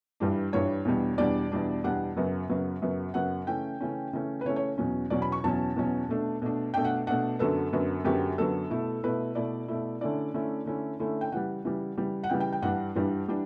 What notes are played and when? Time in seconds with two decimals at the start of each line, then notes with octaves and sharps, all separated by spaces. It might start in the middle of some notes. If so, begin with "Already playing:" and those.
0.20 G2 E3 G3 D4
0.52 G2 E3 G3 D4 C#5
0.85 E2 B2 G3 D4
1.18 E2 B2 G3 D4 D5
1.52 E2 B2 G3 D4
1.84 E2 B2 G3 D4 F#5
2.17 F#2 C#3 F#3 B3
2.50 F#2 C#3 F#3 B3
2.82 F#2 C#3 F#3 B3
3.14 F#2 C#3 F#3 B3 F#5
3.47 C#3 E3 A3 C#4 G5
3.81 C#3 E3 A3 C#4
4.13 C#3 E3 A3 C#4
4.41 B4
4.45 C#3 E3 A3 C#4 C#5
4.56 C#5
4.78 E2 B2 F#3 C#4
5.10 E2 B2 F#3 C#4 D5
5.22 B5
5.32 C#6
5.44 E2 B2 F#3 C#4 A5
5.76 E2 B2 F#3 C#4
6.09 B2 A3 D4
6.42 B2 A3 D4
6.74 B2 A3 D4 G5
6.85 F#5
7.07 B2 A3 D4 F#5
7.39 F#2 D3 F#3 B3 A4
7.73 F#2 D3 F#3 B3
8.04 F#2 D3 F#3 B3 G4
8.38 F#2 D3 F#3 B3 A4
8.70 B2 A3 E4
9.03 B2 A3 E4 B4
9.35 B2 A3 E4 D5
9.68 B2 A3 E4
10.01 D3 A3 C#4 E4 D5
10.34 D3 A3 C#4 E4
10.66 D3 A3 C#4 E4
11.00 D3 A3 C#4 E4
11.21 G5
11.32 C#3 E3 G3 F#5
11.65 C#3 E3 G3
11.98 C#3 E3 G3
12.24 F#5
12.30 C#3 E3 G3 G5
12.40 G5
12.53 G5
12.62 G2 E3 G3 D4 F#5
12.95 G2 E3 G3 D4
13.28 E3 G3 D4